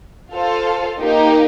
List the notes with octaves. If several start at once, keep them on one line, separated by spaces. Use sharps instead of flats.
F4 A4 C5 F5
A#3 D#4 G4